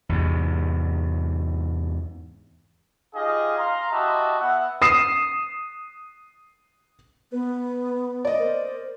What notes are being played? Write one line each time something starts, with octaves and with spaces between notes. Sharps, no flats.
E2 G#2 C3
D#4 F4 G4 G#4 D#5 F5
F5 A#5 C6
E4 F#4 G4 D#5 E5 A5
B3 E5 F#5
D#6 C7 E7
B3 B4
D5 D#5
A#4 C5